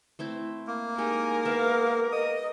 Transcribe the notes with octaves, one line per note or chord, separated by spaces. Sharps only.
A3 C4 E4
A#3
G#3 D#4 G4 A#4 G#5
B3 E5 F5
D#5 D#6